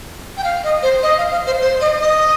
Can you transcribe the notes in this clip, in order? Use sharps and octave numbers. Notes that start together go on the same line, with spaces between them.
G5
F5
D#5
C5
D#5
F5
F5
C5
C5
D#5
D#5